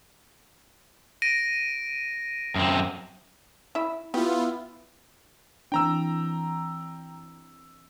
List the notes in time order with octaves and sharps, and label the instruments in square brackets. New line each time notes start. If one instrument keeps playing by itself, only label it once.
[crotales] A#6 D7 D#7
[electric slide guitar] F#2 C4
[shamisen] E4 E5
[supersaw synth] B3 F4 [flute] E4 [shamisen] G4
[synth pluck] E3 C4 D4 [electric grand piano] G5 A#5 E6